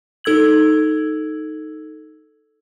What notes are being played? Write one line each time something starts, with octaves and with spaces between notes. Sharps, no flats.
D#4 A4 E6 G#6 F#7